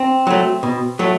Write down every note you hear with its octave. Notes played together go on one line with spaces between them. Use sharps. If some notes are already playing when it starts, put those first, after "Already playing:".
Already playing: C4
F#3 A3
B2
F#3 A3